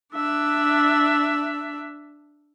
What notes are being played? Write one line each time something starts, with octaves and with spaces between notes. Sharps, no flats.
D4 E5